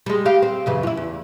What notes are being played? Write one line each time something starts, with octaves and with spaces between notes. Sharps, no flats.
G3 G#3
G4 F5
C4
F#2 C#3 E3
E4 F4
E2